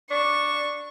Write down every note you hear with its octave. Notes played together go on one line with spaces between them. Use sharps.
D4 C#6